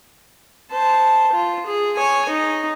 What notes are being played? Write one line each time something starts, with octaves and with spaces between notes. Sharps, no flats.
C5 A5
F4
G#4
C#5 G#5
D#4